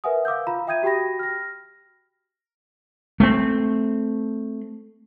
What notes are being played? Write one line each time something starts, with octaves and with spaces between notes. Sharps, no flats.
A#4 B4 E5 F#5 G#5 D#6
F5 D6 E6 G6
F4 F5 A#5 B5
E5 G5 D#6 G6 G#6 D#7
F#4 G4 G5 B5 A#6
F6 A#6
A3 B3 C4